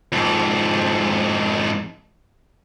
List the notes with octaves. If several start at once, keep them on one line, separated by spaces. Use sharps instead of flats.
F2 G#2